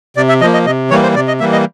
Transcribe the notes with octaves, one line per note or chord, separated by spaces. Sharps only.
C3 D5
E5
F3 A#3 D#5
D#5
C3 D#5
E3 G3 A#3 C#5
C5
C3 D5
D#5
E3 G3 A#3 E5
D#5